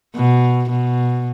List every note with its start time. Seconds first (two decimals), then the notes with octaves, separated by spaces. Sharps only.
0.16 B2
0.69 B2